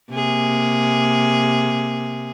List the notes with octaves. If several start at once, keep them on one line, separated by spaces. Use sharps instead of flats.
C3 A#3 G#4